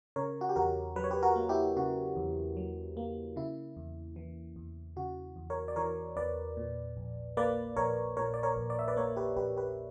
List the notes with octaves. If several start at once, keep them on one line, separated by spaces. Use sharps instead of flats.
C#3 A#4 C#5
F#4
G4
E2 F#4 A#4
F#3 B4
C#5
G4 B4
F#4 A#4
A#3
E4 G4
C#3 F#4
E2
F#3
A#3
C#3 E4
E2
E3
E2
C#3 F#4
E2
A#4 C#5
D5
E3 A#4 C#5
E2 B4 D5
A#2
A#1
A#3 B4 D5
A#1 A#4 C#5
A#2 A#4 C#5
D5
A#4 C#5
A#1
D5
E5
B4 D5
A#3 A#4 C#5
G4 B4
A#1 G4 B4
G4 B4